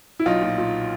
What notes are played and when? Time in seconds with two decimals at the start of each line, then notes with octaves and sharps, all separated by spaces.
0.19 E4
0.26 B1 D#4 F4
0.42 A#2
0.58 A#2